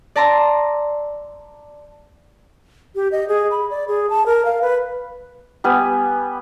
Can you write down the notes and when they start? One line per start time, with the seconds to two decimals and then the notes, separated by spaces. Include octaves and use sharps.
0.16 D5 A5 A#5 C6 E6
2.96 G4
3.12 D#5
3.28 G#4
3.51 B5
3.70 D5
3.88 G#4
4.10 A5
4.26 A#4
4.45 F5
4.62 B4
5.64 G3 B3 G#5